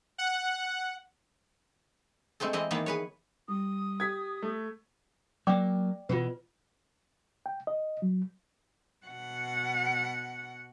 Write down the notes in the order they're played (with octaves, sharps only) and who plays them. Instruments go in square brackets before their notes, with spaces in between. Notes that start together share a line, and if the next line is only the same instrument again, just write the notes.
[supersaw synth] F#5
[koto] G#3 A3 C4 A4
E3 G#3 C4 D#5
D#3 E3 A#3 B3
G#4 B4 C#5
[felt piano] G3 [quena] D#6
[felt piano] G4 [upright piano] G#6 B6
[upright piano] A3
[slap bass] F#3 A#3 [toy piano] D5 G5 D6
[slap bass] B2 E3 [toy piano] F4 B4
[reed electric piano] G5
D#5
F#3
[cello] B2 F#5